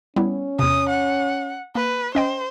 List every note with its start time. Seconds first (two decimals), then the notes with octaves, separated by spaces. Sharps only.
0.16 G3 B3 C#4 E4
0.59 E2 C3 D#6
0.90 F#5
1.75 A#3 B4
2.15 C#4 C5 D#5 G5